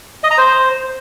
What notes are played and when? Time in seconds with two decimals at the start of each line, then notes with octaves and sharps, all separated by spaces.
0.24 D#5
0.31 A#5
0.38 C5